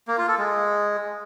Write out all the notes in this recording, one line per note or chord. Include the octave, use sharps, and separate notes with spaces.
A#3
F4
A4
G#3